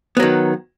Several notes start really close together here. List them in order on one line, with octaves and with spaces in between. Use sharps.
B3 F#3 D#3